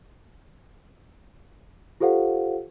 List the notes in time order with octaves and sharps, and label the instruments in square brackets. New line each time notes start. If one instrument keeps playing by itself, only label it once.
[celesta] F4 G4 A4 C5 F5 F#5